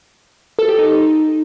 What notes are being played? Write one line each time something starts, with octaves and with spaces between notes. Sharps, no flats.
A4
G4
D#4